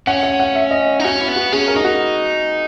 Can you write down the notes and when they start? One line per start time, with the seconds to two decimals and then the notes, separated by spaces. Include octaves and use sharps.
0.07 C#4 F#5
0.23 F#5
0.40 F#5
0.55 E5
0.71 D#5
1.00 D#4
1.04 C#4 F#4
1.20 E4
1.28 B3
1.36 F#4
1.52 C#4 G#4
1.68 A#4
1.76 D#4
1.84 F#4